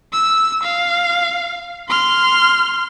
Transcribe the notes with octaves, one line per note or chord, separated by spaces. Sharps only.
E6
F5
C6 F6